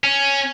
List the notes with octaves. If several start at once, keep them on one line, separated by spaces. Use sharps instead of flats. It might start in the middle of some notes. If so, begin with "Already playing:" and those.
C#4